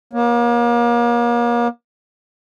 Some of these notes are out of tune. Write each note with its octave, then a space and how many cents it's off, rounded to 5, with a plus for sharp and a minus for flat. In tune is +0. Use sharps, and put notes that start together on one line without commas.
A#3 +35 C#5 +0